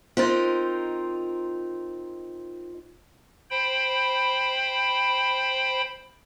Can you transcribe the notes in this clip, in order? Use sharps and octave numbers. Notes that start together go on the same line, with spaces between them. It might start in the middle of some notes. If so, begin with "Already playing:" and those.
C4 D#4 F4 A#4 C6 A6
C5 G5 B5